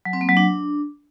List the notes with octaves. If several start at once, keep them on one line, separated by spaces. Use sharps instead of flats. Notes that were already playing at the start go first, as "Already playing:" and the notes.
F#3
C4
A#3
F#3
D4